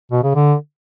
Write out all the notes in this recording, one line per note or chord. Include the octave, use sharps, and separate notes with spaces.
B2
C#3
D3